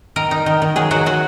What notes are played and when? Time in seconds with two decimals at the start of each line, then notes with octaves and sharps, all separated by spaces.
0.16 D#3 A#4
0.31 D#4
0.46 D#3
0.62 D#3
0.76 F#3 G#4
0.91 F#3 F#4
1.06 F#3 F#4